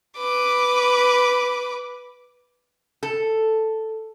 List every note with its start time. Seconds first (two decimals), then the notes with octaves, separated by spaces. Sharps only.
0.18 B4 D6
3.03 A4